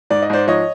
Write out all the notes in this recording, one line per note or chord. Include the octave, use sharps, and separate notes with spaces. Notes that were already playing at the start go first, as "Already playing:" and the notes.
G#2 D5
D#5
G#2 C5 D5
F3 C#5 D#5